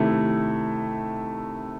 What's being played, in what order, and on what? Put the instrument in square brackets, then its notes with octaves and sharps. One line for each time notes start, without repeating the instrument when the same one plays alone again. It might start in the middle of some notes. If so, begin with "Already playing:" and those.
Already playing: [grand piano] C3 D#3 A3 E4